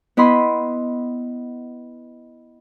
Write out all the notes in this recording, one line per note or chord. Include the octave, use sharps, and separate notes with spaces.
B3 E4 D#5 B5 C6